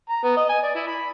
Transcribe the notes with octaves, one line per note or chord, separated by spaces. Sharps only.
A#5
B3
D#5
G#5
D5
E4
B5